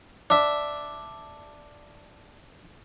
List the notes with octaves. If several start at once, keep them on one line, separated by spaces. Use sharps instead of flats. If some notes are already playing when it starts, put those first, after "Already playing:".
D4 E5